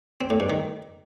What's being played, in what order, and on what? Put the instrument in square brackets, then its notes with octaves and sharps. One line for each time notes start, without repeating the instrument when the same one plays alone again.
[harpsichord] C4
A2
G2
D#3